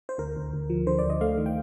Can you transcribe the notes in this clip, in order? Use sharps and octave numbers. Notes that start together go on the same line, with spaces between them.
C5
D2 A#4
D2
D2
F3
D3 C5
D5
D2
D#5
A3 F5
D#3
G5